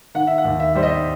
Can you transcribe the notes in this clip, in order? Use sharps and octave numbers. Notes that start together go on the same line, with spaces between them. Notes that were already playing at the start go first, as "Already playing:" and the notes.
D#3 F#5
E5
F#5
D#2
E5
G3 C5
D#5